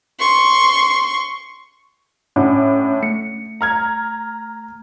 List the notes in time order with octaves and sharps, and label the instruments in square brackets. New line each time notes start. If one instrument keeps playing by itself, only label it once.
[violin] C6 C#6
[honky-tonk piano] A2 D4 D6 [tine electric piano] C#4 F#5
[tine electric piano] A3 [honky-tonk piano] C#7
[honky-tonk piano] A#5 F6 G#6